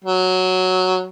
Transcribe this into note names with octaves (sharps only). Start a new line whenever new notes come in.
F#3